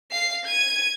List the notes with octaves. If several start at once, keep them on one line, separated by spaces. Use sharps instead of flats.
F5 C7
G#6 D#7